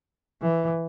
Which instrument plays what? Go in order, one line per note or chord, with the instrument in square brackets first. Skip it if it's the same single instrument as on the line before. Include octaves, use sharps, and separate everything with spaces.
[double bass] E3